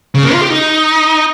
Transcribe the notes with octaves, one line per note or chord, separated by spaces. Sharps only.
C#3
A#3
F4
G4
D#4